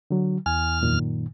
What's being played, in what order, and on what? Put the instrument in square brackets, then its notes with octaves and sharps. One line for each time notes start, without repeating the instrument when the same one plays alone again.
[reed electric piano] D3 F#3
[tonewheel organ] E2 F6 [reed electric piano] G#5
[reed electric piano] F#2 A#2 D#3